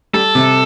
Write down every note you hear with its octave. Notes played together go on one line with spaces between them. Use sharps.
G3 A4
C3